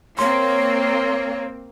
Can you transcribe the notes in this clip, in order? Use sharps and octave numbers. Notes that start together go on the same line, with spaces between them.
A#3 C4 C#5 C6